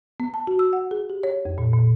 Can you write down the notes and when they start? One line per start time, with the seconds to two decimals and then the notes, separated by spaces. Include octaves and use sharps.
0.20 B3
0.34 A5
0.47 F#4
0.59 E6
0.73 F#5
0.91 G#4
1.10 G4
1.23 C#5
1.45 F2
1.58 A#2
1.74 A#2